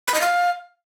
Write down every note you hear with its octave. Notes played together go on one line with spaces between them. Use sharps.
B5
D#5
F5